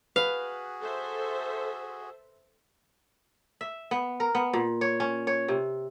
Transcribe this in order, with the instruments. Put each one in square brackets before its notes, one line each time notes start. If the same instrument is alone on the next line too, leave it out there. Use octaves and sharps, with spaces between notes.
[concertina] F#4 G#4 [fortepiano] B4 [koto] F5
[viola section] A4 C5 E5
[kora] E5
B3
A#4
B3
A#2
C#5
C#4
C#5
C3